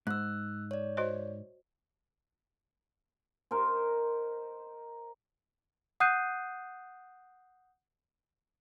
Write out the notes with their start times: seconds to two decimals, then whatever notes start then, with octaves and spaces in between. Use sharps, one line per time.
0.07 G#2 E6 F#6
0.71 C#5 D5
0.97 F#4 C5 D#5
3.51 D#4 A#4 C5
6.00 F#5 D#6 F#6 G6 C7 D#7